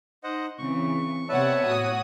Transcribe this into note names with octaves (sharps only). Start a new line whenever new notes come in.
D#4 C5 D#5 F#5
C#3 E3 C4 C#6
C3 B3 B4 C#5 D5 E5 F#5 A5
A2 F#4 D#6